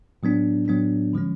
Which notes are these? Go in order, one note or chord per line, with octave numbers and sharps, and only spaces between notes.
A2 F#3 B3 D4
A2 F#3 B3 D4
D3 F3 G#3 C#4